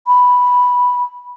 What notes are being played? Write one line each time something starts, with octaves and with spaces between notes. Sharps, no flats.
B5